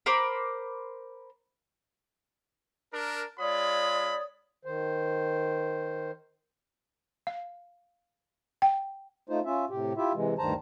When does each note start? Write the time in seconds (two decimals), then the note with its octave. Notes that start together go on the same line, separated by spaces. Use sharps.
0.06 A#4 C5 B5 D6
2.93 D4 A#4
3.39 G#3 F4 C#5 D5 B5 D#6
4.65 D#3 C5
7.27 F5
8.62 G5
9.30 A3 D#4 F4 C5
9.45 C#4 F4 E5
9.70 A2 C3 G4
9.97 E4 F4 G4 E5
10.15 C3 E3 G#3
10.38 D2 G2 D#3 C5 A5 A#5